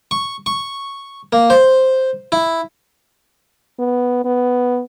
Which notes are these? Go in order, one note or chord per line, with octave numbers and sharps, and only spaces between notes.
C#6
C#6
A#3
C5
E4
B3
B3